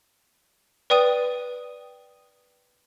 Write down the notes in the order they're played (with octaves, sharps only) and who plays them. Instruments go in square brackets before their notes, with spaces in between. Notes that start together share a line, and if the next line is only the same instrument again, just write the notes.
[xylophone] B4 D5 G5 D#6 D#7